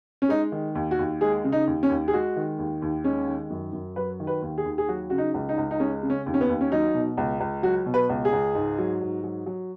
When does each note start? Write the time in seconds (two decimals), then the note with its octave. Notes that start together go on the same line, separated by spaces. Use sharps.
0.22 C#4
0.29 G#3 D#4
0.52 D#3
0.75 D#2
0.91 F#4
0.99 D#2
1.21 G#3 G#4
1.44 C#3
1.52 D#4
1.67 D#2
1.83 C#4
1.89 D#2
2.08 G#4
2.13 G#3 F#4
2.36 D#3
2.58 D#2
2.82 D#2
3.04 G#3 C#4
3.28 D#3
3.50 F#2
3.73 F#2
3.96 F#3 B4
4.20 D#3
4.27 B4
4.42 D#2
4.58 G#4
4.65 D#2
4.78 G#4
4.88 F#3 F#4
5.10 C#3 F#4
5.18 D#4
5.34 C#2
5.49 D#4
5.57 C#2
5.71 D#4
5.80 G#3 C#4
6.03 C#3
6.10 C#4
6.26 D#2
6.34 C#4
6.41 B3
6.49 D#2
6.61 C#4
6.72 F#3 D#4
6.94 B2
7.17 C#2
7.40 C#2
7.63 F#3 F#4
7.86 B2
7.94 B4
8.09 C#2
8.25 G#4
8.33 C#2
8.55 G#2
8.78 F#3
9.01 G#2
9.24 F#3
9.46 F#3